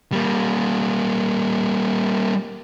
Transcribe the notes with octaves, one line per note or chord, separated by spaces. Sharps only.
G3 A#3